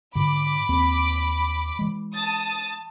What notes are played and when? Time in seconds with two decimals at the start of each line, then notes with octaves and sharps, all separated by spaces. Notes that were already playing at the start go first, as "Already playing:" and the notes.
0.15 G#2 D3 B5 D6
0.69 D#2 C4
1.79 E3 G#3
2.12 A5 D#6 A6